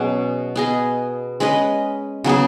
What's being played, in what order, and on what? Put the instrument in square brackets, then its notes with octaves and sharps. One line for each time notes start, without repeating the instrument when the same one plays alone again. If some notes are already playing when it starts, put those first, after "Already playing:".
Already playing: [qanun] B2 F#3 C#4 G#4
B3 G#4 D#5
G#3 C#4 B4 D#5
C#3 F#3 B3 G#4